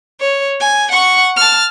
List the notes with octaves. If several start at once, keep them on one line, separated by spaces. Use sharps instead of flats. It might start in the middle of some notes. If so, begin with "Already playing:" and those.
C#5
G#5
F#5 C#6
A5 F6